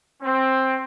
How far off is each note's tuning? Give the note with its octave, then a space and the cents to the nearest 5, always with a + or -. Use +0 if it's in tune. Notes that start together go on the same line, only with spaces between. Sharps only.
C4 +10